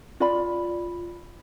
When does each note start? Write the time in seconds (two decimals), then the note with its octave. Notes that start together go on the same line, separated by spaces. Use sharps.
0.20 F4 D5 B5